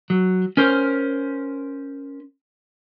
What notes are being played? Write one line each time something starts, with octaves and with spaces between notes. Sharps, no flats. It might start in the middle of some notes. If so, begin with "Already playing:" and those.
F#3
C#4 A#4 C5